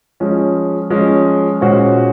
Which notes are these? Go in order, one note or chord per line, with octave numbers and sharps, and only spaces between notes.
F3 G#3 C#4
F3 G#3 C#4
A#2 G#3 C#4 F#4 C5